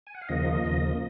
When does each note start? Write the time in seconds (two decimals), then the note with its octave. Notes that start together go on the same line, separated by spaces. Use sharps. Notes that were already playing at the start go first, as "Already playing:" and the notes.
0.07 G#5
0.15 F#5
0.21 F5
0.29 D#2 C#3 F3 A#3 D#5
0.65 D#2 C#3 F3 A#3